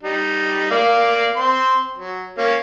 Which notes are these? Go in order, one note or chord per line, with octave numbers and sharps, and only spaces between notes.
G3 D#4
A#3 D5 F5
C4 C6
F#3
A#3 C#4 C#5